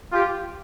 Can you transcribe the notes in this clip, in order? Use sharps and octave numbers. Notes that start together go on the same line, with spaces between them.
F4 G4